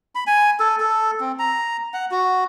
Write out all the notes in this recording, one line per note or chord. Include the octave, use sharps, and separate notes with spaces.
B5
G#5
A4
A4
C4
A#5
F#5
F#4